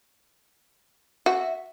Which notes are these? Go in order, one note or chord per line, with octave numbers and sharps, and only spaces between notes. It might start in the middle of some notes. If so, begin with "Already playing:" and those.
F#4 E5